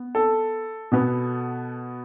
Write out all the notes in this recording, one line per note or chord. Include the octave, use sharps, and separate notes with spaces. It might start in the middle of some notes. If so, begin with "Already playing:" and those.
Already playing: B3
A4
B2 B3